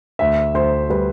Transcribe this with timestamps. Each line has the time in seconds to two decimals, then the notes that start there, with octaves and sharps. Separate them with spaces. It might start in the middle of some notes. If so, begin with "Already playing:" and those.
0.19 D2 E5
0.54 D2 C5
0.90 G3 B4